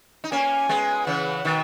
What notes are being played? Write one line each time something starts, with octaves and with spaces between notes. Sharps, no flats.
D#4
A#3 C#4 G#5
G#3 B3
C#3 E3 F#5
B2 D#3